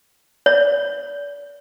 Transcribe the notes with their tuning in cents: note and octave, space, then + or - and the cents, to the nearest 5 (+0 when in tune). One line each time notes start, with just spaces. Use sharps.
D5 -35